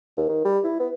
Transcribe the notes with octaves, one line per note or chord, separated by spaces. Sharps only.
D#2
D#3
G3
E4
B3